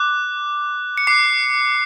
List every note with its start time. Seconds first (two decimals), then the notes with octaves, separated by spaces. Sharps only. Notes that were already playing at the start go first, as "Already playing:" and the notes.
Already playing: D6 F#6
0.98 C#7
1.07 D6 F#6 C7